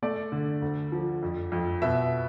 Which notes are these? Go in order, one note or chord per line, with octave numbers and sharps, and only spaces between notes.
A3 D5
D3
D2
F3
F2
F2
B2 E5